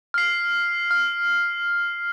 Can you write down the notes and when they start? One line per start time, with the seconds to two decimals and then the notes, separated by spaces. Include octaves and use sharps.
0.14 F6 C7
0.91 F6